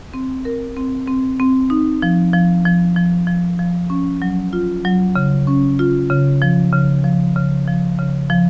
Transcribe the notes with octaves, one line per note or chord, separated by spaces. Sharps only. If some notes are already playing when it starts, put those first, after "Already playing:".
C4
A#4
C4
C4
C4
D#4
F3
F3
F3
F3
F3
F3
C#4
F#3
F4
F#3
C#3
C#4
F4
C#3
F3
C#3
F3
C#3
F3
C#3
F3